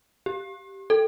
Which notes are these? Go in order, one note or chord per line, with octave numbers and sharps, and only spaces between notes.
G4
A4